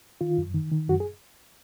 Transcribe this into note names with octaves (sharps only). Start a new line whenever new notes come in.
D#3 F4
F#2
D#3
D#3
F#2 F#4
G#4